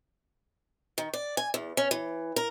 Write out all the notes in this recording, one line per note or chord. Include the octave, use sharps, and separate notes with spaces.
D#3
D5
G#5
E2
C#4
E3
A#4